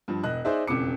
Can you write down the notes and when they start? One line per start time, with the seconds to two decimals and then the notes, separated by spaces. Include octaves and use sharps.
0.08 G2 F3
0.24 E1 D#5 F#6
0.45 D#4 G#4 C5 D5 E5
0.68 E1 F2 C#3 D6 C#7